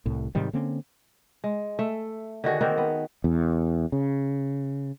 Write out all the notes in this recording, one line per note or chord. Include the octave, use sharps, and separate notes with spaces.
C2 A2
G#2 C3 D#3 G3
D3 A#3 C4 C#4
G#3
A3 E5
D3 D#3 F#4 G#4
D#3 A#3 C4
B3
E2
C#3